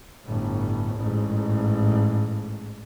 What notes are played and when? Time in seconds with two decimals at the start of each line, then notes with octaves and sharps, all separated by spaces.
0.25 G1 A2
0.96 A1 G#2